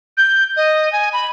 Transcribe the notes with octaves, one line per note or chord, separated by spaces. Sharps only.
G6
D#5
G#5
B5